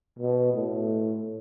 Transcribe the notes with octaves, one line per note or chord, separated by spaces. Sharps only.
B2
A2